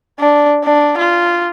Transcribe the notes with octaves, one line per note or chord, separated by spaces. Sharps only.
D4
D4
F4